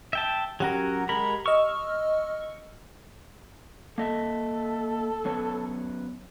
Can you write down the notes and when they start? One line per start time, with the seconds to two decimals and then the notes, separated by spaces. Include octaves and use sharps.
0.13 E5 G5 A5
0.60 F#3 C#4 G4 A#4 F#5 A#5
1.09 G#3 A#4 B5
1.46 D#5 C#6 E6 F6
3.98 A#3 A4 D#5 E5
5.25 F#2 B3 C#5